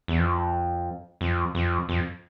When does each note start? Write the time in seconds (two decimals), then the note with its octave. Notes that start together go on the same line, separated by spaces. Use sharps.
0.08 E2
0.19 F2
1.21 F2
1.55 F2
1.89 F2